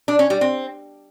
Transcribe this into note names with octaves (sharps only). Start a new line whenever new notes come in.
D4
C#4
G3
C4